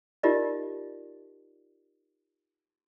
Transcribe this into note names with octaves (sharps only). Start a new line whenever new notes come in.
D#4 F4 G4 A#4 D5 D#5